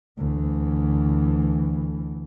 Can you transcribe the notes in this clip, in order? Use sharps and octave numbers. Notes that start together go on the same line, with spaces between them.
D2 E3